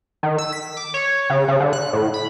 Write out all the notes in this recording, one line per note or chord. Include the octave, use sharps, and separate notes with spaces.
D#3
E6
B6
D6
C#5
C#3
C#3
D3
F#6
A2
B5